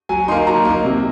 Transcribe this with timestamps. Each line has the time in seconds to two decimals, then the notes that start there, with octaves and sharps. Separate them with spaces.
0.09 F#3 G#5
0.28 A#3 D#4 C6
0.47 F#3 A#5
0.65 A#3 D#4
0.84 C3